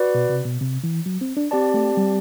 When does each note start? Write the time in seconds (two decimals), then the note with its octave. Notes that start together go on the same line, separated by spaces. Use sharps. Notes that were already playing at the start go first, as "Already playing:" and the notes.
Already playing: F#4 B4 D5
0.15 B2
0.30 C3
0.45 B2
0.61 C3
0.84 E3
1.06 F#3
1.21 C4
1.37 D4
1.51 C4 G4 D5 A5
1.74 A3
1.97 G3